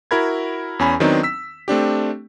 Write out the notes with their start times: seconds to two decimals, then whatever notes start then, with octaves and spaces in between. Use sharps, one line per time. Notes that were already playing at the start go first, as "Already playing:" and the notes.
0.11 E4 F#4 A#4 B5 G#6
0.79 E2 C#4 G#5 B5
1.00 D#3 F#3 B3 C4 D4 D#4
1.23 E6 B6
1.68 A3 C4 D4 G4